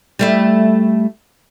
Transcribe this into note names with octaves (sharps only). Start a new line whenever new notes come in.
G3 A3 E4